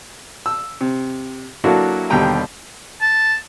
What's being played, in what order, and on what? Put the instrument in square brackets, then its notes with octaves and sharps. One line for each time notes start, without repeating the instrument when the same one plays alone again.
[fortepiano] E6
C3
F#3 A#3 D4 E4 F#4 A4
D#2 B2 D3 G3 G5 A#5
[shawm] A5